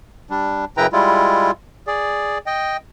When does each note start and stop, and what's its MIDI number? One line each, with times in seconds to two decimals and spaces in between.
0.30 0.65 55
0.30 0.65 62
0.77 0.87 42
0.77 0.87 49
0.77 0.87 64
0.77 0.87 71
0.77 0.87 79
0.77 0.87 82
0.93 1.51 55
0.93 1.51 56
0.93 1.51 64
0.93 1.51 65
1.87 2.38 68
1.87 2.38 74
2.46 2.77 75
2.46 2.77 79